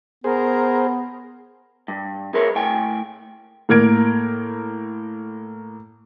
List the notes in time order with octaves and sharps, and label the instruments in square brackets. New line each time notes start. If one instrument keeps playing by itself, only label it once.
[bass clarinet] B3 [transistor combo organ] G#4 C5 [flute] A#4
[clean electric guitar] G2
G#4 A#4 B4 C#5 E5
A2 G5 G#5
[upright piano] A2 A#3 A#4 G#6 D7